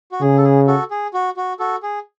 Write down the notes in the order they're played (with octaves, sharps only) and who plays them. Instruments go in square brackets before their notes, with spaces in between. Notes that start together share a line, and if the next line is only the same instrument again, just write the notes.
[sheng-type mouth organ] F#4
[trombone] C#3 [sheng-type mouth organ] G#4
[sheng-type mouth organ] A4
G#4
F#4 A4
G#4
F#4
F#4
F#4 A4
G#4